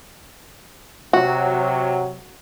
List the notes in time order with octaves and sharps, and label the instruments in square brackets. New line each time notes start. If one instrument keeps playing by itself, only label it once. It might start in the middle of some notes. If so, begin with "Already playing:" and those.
[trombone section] C3 F#3 [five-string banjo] F#4